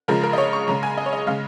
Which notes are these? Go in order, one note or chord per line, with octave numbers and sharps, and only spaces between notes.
C#3 F3 G#3 A#4
A#4
D#5
C#5
C#6
C#3 G#3 A#5
G#5
D#5
C#5
D#5
C#3 G#3 F5